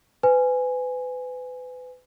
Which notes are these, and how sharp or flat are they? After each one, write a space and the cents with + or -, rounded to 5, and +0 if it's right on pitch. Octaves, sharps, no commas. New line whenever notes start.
B4 +30 G#5 +0